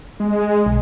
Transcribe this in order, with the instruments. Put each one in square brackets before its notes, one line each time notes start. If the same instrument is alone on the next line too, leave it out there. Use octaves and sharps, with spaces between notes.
[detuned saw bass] G#3
[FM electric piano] B1